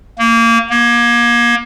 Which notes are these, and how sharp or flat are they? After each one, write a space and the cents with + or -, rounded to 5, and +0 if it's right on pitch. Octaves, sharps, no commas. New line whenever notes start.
A#3 -20
A#3 +30